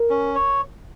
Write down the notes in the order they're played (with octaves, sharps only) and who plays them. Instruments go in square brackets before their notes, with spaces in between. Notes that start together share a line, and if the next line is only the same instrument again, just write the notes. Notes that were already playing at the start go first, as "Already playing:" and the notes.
Already playing: [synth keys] A#4
[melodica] C#4
C#5